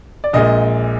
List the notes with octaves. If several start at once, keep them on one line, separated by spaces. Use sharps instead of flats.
D5
A#1 A#2 G#3 D#5